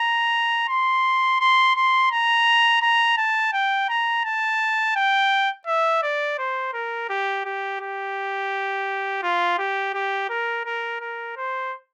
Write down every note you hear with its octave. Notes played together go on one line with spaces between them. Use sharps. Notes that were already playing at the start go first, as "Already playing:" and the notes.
Already playing: A#5
C6
C6
C6
A#5
A#5
A5
G5
A#5
A5
G5
E5
D5
C5
A#4
G4
G4
G4
F4
G4
G4
A#4
A#4
A#4
C5